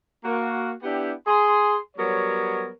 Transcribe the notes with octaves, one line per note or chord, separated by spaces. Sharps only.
A#3 F#4
B3 D4 E4 G4
G#4 C6
F#3 G3 B3 A#4 C#5